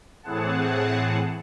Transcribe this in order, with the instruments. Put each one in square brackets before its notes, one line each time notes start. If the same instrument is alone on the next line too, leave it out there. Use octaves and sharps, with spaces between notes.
[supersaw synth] A2 E3 C4 G#4 F#5 A5